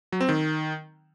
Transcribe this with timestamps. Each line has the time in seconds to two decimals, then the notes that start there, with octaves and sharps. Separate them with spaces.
0.12 F#3
0.21 C4
0.29 D#3